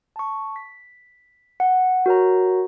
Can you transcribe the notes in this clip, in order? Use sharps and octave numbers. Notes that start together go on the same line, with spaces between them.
A5 C#6
B6
F#5
F#4 A#4 C#5 A#5